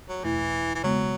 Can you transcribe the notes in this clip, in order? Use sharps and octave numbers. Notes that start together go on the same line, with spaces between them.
F#3
E2 B2 E3 A3 E4
E3
C#3 F#3 G#3 B3